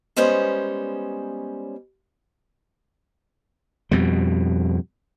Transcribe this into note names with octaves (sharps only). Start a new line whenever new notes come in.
G3 G#3 B3 C#4 C5 C#5
F2 B2 G3